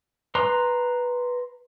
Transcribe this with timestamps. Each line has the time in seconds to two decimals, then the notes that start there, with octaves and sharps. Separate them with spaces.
0.35 B4 A#5 C6